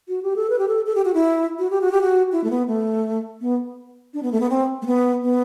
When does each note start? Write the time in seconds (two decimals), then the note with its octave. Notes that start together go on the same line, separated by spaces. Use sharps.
0.09 F#4
0.23 G4
0.36 A4
0.50 B4
0.59 G4
0.68 A4
0.86 A4
0.95 G4
1.05 F#4
1.14 E4
1.59 F#4
1.70 G4
1.81 F#4
1.92 G4
2.02 F#4
2.32 E4
2.44 A3
2.50 B3
2.68 A3
3.41 B3
4.14 D4
4.23 B3
4.32 A3
4.40 B3
4.50 C4
4.82 A3
4.86 B3
5.23 B3